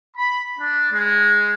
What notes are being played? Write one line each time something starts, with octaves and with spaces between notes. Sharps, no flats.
B5
D4
G#3